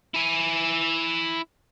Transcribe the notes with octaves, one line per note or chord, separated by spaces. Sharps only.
E4 G#5